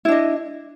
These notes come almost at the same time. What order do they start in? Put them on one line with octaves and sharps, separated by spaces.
E4 D4 D#5